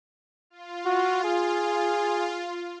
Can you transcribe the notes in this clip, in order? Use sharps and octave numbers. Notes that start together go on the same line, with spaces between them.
F4
F#4
G#4